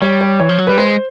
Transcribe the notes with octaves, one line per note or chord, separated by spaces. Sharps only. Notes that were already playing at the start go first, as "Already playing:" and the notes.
G3 C#5
C#5
E3 C#5
F3
F#3
G3 B4
G#3 C5